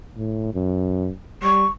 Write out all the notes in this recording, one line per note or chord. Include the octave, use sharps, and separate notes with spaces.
A2
F#2
G3 C#6